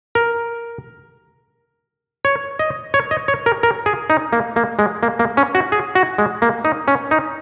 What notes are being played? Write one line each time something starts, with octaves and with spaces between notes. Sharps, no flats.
A#4
C#5
D#5
C#5
D#5
C#5
A#4
A#4
G#4
D#4
A#3
A#3
G#3
A#3
A#3
C#4
F#4
G#4
F#4
G#3
A#3
D#4
C#4
D#4